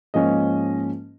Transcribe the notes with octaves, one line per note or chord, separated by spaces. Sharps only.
G#2 F3 A#3 C#4 D#5